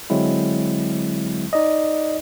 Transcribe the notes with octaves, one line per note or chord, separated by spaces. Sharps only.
D3 F#3 G#3 C4 E4
D#4 D5 D#5